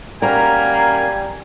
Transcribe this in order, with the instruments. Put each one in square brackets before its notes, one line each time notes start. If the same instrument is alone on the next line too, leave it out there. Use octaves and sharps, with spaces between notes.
[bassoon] G3 [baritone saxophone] A#3 [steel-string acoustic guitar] C#4 F#4 A#4 [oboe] G#5